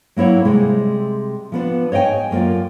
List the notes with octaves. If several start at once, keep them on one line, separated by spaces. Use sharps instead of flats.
F#3 A#3 E4 C#5 F#5
C3 G3 G#3
F3 B3 D4
C#5 D#5 F5 G5 G#5
F#2 A#3 F4 D5